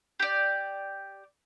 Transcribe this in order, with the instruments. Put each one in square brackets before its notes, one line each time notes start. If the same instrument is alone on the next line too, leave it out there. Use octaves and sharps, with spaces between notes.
[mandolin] G4 D5